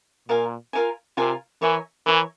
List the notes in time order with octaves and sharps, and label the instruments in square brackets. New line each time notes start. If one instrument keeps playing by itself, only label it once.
[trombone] A#2 [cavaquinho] F4 A#4 F5 G#5
[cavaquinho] F4 A#4 F5 G#5
[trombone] C3 [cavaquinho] F4 A#4 F5 G#5
[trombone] E3 [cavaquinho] A#4 C#5 E5 G#5
[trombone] E3 [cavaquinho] A#4 C#5 E5 G#5